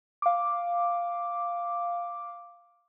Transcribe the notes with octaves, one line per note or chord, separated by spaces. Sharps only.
F5 D6